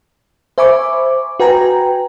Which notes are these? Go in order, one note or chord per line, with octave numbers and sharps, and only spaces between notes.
C5 E5 G#5 B5 C#6 D6
F#4 B4 G5 G#5 A#5